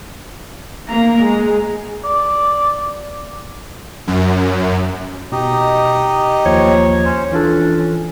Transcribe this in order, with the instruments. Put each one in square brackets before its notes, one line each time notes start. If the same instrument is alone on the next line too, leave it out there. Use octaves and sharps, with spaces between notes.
[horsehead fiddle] A#3 A#5
G#3
[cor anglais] D5
[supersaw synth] F#2
[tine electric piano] B2 [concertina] D#4 G4 D#5
[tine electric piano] D#2 F3 A#3 [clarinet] C#5
[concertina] C#4 C5
[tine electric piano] E3 F4 A4 [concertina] C#4 [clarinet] D4